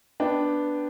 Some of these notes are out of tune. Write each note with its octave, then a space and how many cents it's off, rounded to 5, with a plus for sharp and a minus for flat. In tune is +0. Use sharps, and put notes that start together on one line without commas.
B3 +0 D4 +0 G5 +0